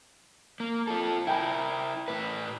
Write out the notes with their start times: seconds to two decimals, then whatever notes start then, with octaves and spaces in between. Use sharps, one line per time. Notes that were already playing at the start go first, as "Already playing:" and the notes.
0.60 A#3
0.87 F4 A4
1.27 E4 A#4 G5 G#5 B5
2.08 A2 B4